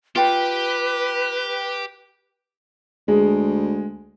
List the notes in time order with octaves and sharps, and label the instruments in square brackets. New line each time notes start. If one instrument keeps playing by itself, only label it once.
[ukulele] F4 G5 [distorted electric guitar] G4 [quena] B4
[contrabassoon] D2 [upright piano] G#3